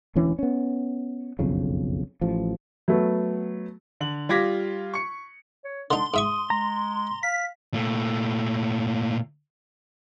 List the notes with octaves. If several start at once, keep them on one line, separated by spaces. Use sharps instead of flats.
E1 D2 E3 C#4
B3 C#4
F#1 B1 F2 C#3
A1 F3
F#3 A3 B3
D3 F#7
G3 F4 D6 G#6 A#6 B6
C#6 C#7
C#5
D3 D4 D#4 C6
G#2 E5 C#6 D#6
G#3 A#5
F5 B6
A#2 A3